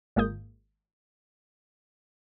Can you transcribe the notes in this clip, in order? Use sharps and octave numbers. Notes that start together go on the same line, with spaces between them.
G#1 G#3 A#3 F4 D#6 G6